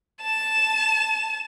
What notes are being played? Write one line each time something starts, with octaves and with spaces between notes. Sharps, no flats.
A5 E7